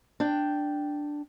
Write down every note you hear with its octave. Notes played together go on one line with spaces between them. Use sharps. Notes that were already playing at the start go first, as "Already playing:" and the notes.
D4 G5